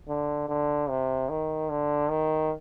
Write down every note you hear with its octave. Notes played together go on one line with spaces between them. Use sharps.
D3
D3
C3
D#3
D3
D#3